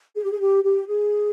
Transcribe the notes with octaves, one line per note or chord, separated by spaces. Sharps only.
G#4
G4
G#4
G4
G4
G#4